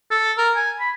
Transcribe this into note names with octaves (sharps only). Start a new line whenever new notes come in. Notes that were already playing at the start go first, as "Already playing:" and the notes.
A4
A#4
G#5
B5